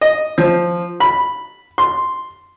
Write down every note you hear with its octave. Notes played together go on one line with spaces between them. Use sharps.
D#5
F3
B5
C6